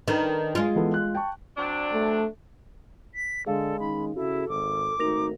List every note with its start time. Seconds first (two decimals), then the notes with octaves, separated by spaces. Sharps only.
0.08 D#3 D4 A4 B4
0.55 G#3 F4
0.75 E3 B3 A4
0.94 F#6
1.15 G5 A5 C#6
1.57 F#3 C4 D4
1.93 A3
3.15 B6
3.46 D3 G#3 G#4 A4 D5 F5
3.80 D#3 C#4 D#4 B5
4.15 C#3 E4 F#4 A4
4.49 G#1 D6
4.99 G#1 A3 D#4 F#4 A#4 A#6 F7